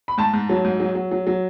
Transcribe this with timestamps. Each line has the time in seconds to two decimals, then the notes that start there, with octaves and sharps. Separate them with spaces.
0.08 B5
0.18 G#2 A5
0.33 G#2
0.50 F#3
0.65 G#2
0.80 F#3
0.95 F#3
1.11 F#3
1.27 F#3